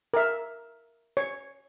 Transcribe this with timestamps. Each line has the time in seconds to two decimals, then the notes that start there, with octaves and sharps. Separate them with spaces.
0.14 A#4 E5
1.17 C#5